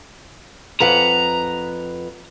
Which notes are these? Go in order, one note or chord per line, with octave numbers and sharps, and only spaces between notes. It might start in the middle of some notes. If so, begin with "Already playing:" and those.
F2 B4 F#5 A#5